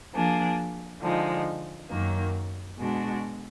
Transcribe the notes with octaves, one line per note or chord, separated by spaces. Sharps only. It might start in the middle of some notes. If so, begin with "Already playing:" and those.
F3 A#3 D4 G#4
D3 F3 G#3 D#4
F#2 D#3 F#3 A#3
B2 G#3 D4 F#4